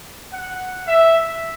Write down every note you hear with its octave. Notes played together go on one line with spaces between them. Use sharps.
F#5
E5